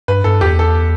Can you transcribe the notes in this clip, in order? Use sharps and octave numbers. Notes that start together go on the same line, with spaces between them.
G2 B4
G2 A4
E2 G4
A4